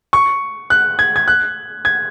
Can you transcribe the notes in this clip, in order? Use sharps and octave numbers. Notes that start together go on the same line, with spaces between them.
C#6
F#6
G#6
G#6
F#6
G#6